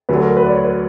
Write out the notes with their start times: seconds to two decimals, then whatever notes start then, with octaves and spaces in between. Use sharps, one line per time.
0.09 D2 D3 F#3 B4
0.23 A#4
0.37 B4
0.46 D5
0.51 C#5
0.65 B4